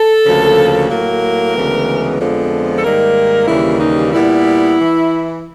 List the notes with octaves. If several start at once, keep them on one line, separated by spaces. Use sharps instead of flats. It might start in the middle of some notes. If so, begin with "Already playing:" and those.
Already playing: A4
D2 C#3 F3 A#3
A2 F#3 A#3 A#4
D2 C#3 E3 G#3 B3
F2 D3 F3 G#3 B3
A4
G#2 D#3 G3 A#3 A#4
D#2 C#3 E3 G3 A#3 E4
D#4
A#2 G3 B3 E4
E3